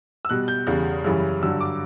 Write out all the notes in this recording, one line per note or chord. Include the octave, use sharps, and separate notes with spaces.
E6
B2 G3 F#6
G6
E2 C#3 G3
F#2 C#3 E3 G3
G2 D3 F#3 E6
D6